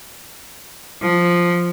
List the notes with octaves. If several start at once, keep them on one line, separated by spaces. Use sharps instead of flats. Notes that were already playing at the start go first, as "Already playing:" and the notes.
F3